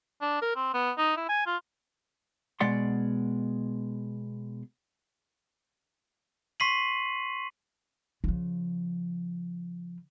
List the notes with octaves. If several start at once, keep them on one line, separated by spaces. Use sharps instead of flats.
D4
A#4
C4
B3
D#4
E4
G#5
F4
B2 G#3 D5 F#5 C6
C6 C#6 B6 C7 D#7 F#7
C#3 F3